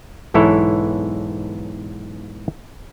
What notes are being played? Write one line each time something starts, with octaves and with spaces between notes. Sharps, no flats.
B1 G#2 E3 E4 A4 C#5